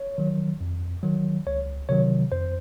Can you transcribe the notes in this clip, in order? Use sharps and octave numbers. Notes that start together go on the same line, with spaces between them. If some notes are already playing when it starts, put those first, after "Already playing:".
Already playing: C#5
D#3 F#3
F2
D#3 F#3
C#2 C#5
C3 D#3 F#3 C#5
F2 C5